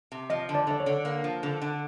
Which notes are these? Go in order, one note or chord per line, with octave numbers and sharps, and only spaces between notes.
C3
F3 D#5
D3
D5
D3 D5
C#5
D3
A#3
F3
D3
D3